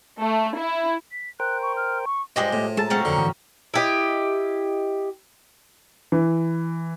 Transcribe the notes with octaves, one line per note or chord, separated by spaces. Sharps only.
A3
E4
B6
A#4 C5 G5 F#6
C#6
F6
C#6
G2 F3 G#3 G4 G#4 D#5
A2
G#3 G#4 A4 A5 A#5 A6
F#3 C4 C#4 F5
F2 D3 A#3 A#4
G#2 E3 G5 G#5 D#6
E4 G4 D#5
E3